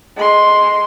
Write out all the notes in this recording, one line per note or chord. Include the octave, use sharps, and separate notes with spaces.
G#3 C6